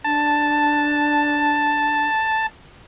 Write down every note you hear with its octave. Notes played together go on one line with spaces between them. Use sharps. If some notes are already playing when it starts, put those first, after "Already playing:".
D4 A5